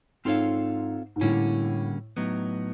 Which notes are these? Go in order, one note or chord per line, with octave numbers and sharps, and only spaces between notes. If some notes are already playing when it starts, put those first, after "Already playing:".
G#2 C4 F4 A4 C#5 F5
G#2
A2 D3 G3 A#3 C#4 F#4
A2 F#3 B3 D#4